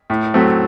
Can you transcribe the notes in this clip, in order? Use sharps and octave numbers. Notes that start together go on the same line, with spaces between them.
A2
F#3 A3 C4